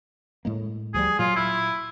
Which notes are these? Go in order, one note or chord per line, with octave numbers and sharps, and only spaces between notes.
A2 G#3 A#3
D2 F3 G3 G#4
A#2 F#3 F4
E4